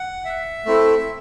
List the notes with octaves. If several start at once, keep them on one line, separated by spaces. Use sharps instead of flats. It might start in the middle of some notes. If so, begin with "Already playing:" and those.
Already playing: F#5
E5
A3 C4 E4 A4